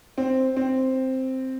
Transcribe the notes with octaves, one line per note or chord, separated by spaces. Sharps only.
C4
C4